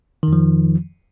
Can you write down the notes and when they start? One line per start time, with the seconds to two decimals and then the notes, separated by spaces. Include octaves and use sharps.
0.23 D#3
0.28 F2
0.33 F3